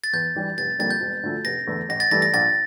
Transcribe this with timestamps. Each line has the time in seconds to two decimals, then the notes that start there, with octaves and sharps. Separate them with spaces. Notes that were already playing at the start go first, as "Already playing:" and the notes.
0.04 A6
0.13 E2 G6
0.35 E3 G3 D4
0.58 F1 A6
0.79 F2 D3 G3 A#3 A6
0.91 G6
1.01 E1
1.23 D2 D3 F3 A3
1.45 F1 A#6
1.67 E2 D3 A3
1.89 A1 A#6
2.00 A6
2.11 G2 E3 A3 A#6
2.22 A#6
2.33 A#1 A6